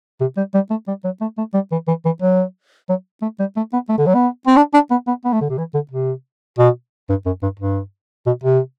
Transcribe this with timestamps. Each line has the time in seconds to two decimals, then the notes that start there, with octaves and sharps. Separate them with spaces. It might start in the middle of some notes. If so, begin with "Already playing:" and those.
0.21 C3
0.37 G3
0.55 G3
0.70 A3
0.88 G3
1.04 F#3
1.21 A3
1.38 A3
1.54 G3
1.72 E3
1.88 E3
2.05 E3
2.22 F#3
2.89 F#3
3.22 A3
3.40 G3
3.56 A3
3.73 B3
3.89 A3
3.98 D3
4.07 F#3
4.15 B3
4.47 C4
4.57 D4
4.74 D4
4.91 B3
5.07 B3
5.25 B3
5.33 A3
5.41 D3
5.50 C3
5.58 E3
5.74 D3
5.92 C3
6.58 B2
7.10 G2
7.26 F#2
7.43 G2
7.60 G2
8.26 B2
8.44 C3